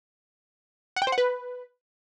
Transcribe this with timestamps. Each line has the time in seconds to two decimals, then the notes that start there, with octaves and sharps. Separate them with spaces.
0.96 F#5
1.02 G5
1.07 C5
1.12 F#5
1.18 B4